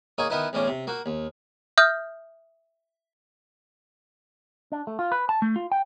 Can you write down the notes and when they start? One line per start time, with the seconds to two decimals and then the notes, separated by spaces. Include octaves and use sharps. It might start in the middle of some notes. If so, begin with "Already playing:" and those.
0.18 A#3 D#4 G#4 C#5
0.30 D#3 B3 D#4 E4 B4
0.53 E2 A2 C4 C#4 D5
0.68 C3
0.87 A#3 F#4
1.06 D#2
1.78 E5 D#6 F6 G6
4.72 D4
4.87 A3
4.99 F4
5.12 B4
5.29 A5
5.42 A3
5.56 F4
5.72 G5